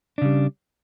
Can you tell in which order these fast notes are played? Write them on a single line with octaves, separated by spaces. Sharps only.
D4 C#3 G3